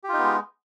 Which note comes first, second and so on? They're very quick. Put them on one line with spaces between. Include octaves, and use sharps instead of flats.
G4 F4 D#4 B3 G#3